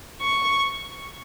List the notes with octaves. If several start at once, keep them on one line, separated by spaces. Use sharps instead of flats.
C#6